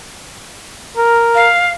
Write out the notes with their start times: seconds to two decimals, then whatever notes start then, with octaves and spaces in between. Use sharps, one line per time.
0.97 A#4
1.35 F5